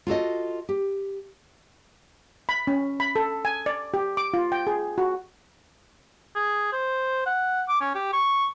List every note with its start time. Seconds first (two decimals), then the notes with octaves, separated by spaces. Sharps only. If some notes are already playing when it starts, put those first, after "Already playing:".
0.07 F4 F#4 A4 D#5
0.69 G4
2.49 B5
2.67 C#4
3.00 B5
3.16 A4
3.45 G#5
3.66 D5
3.94 G4
4.17 D6
4.34 F4
4.52 G5
4.67 G#4
4.98 F#4
6.36 G#4
6.72 C5
7.26 F#5
7.68 D6
7.81 C#4
7.95 G4
8.13 C#6